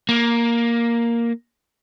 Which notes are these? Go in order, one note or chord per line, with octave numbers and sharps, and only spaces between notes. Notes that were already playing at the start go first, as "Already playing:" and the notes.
A#3